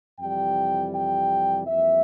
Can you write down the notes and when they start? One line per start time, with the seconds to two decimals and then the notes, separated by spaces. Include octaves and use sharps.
0.18 F2 C3 E3 G3 G5
0.93 G5
1.67 F2 E3 G3 A#3 E5